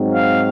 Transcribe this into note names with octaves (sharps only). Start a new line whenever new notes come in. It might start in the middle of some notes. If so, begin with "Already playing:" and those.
Already playing: G#2 F#3 C4 D#4
F5